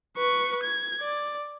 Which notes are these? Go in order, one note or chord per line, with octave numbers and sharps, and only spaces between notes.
B4 C#6
G#6
D5